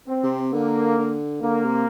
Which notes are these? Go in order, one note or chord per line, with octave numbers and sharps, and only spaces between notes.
C4
C3
D3 A#3
D3
D3 A#3
C3